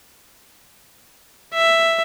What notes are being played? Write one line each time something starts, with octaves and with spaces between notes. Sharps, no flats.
E5